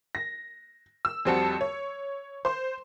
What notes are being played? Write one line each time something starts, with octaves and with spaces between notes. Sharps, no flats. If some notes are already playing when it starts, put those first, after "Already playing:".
A#6
E6
F2 G3 C4 F#4 A5 C#7
C#5
C5 C6